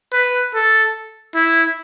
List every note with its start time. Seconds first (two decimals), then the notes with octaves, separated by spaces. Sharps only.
0.13 B4
0.54 A4
1.35 E4